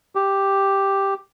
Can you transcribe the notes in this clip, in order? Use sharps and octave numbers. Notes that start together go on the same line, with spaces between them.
G4